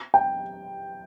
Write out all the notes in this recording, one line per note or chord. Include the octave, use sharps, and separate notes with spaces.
G5